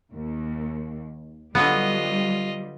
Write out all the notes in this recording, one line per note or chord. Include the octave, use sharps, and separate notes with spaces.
D#2
D3 F#3 G3 B3 F4 D#5